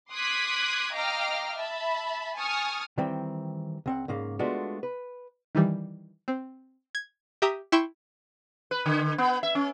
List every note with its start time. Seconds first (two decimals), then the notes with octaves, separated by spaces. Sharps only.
0.11 C6 D6 D#6 F#6 G#6 B6
0.93 D#5 F5 G5 A#5 D6 F6
1.58 E5 A5 B5
2.37 G#5 A5 C#6 D#6 F6
2.98 D#3 E3 G3 C4
3.86 C#2 C4 F#5
4.08 G#2 C#3 A#3
4.39 G#3 A3 B3 D4 F4 F#4
4.83 B4
5.55 D#3 E3 G3
6.28 C4
6.95 G#6
7.42 G4 E5 A#5 D#6
7.72 E4 G5 C6 C#6 G6 E7
8.71 B4
8.86 D3
9.18 B3
9.43 E5
9.55 C#4